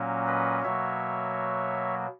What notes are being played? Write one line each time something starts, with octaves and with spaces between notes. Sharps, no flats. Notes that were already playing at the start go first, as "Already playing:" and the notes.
Already playing: A#2 F#3 A#3 C#4
B4 D#5
B2 F#3 A#3 C#5 E5